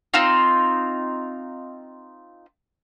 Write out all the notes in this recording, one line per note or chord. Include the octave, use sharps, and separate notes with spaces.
C4 D#4 F4